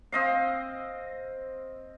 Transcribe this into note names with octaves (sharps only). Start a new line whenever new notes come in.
C4 D#5 F5